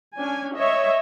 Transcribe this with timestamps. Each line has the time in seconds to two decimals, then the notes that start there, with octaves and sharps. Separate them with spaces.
0.17 C#4 D4 G#5
0.55 C#5 D#5 E5